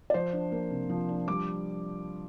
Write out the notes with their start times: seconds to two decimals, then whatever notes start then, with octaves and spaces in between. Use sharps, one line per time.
0.10 D5
0.14 F3 C5
0.33 D4
0.52 A#3
0.71 C3
0.90 F3
1.09 D4
1.28 G3 D6